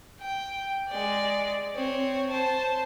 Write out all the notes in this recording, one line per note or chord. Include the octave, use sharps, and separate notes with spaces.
G5
G#3 D5
C4 C#5
C5 A5